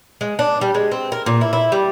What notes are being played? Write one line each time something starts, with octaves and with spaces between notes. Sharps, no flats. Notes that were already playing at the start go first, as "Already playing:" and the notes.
G#3
D4
G3
G#3
C4
A#4
A#2
E4
E4
G3